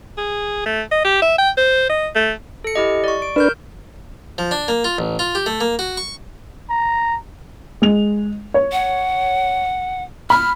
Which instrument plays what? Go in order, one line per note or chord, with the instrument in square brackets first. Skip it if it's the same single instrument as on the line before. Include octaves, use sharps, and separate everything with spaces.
[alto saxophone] G#4
A3
D#5
G4
E5
G5
C5
D#5
A3
[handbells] A4 C#7
E4 G4 D#5
D5 C#6
D7
[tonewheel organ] D4 B4 [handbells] A#4 F6 G6
[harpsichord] F3
D4
A#3
F4
A1
F4
G4
A3
A#3
F#4
C#6
[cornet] A#5
[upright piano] G#3 F7
C#5
[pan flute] F#5
[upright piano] B5 [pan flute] F6